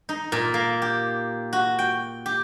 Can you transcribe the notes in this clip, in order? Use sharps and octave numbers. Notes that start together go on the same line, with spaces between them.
D#4
A#2
A#3
G4
F#4
G5
G4